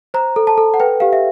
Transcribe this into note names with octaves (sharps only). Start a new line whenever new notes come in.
C5 A#5
A4
A5
A4
F#5
B4 G5
G4 F5
E5